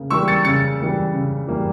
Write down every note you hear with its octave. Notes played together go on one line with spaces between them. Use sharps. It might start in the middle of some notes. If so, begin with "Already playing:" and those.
Already playing: C#3 A#3
E3 G3 A#3 C#6 E6
A6 C#7
C#3 A6 C#7
E3 G3 A#3
C#3
E3 G3 A#3